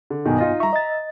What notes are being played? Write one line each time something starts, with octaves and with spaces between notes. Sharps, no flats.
D3
B1 G2 B2 D#3 B3 G#5
D#4 F4 D#5
G3 E5 A#5 C#6
D#5 A6